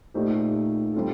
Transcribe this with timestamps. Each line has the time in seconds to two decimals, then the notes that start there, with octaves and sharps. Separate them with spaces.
0.14 A#2 A3 D#4 G4 C5
0.94 G3 C4 F4 A4